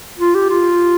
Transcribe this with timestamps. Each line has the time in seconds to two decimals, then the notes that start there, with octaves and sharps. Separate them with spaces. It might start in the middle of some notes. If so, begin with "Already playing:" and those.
0.19 F4
0.35 G4
0.50 F4